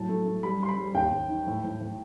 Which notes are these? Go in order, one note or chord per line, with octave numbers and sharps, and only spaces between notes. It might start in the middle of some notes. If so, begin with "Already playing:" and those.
Already playing: A2 F#3 A5
A3
A3
G3 B5
G3 C6
B5
G3
D#2 G5
D#2
D#3
A2
A2
A2